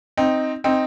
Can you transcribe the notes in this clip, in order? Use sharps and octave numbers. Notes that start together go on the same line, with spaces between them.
C4 D#4
C4 D#4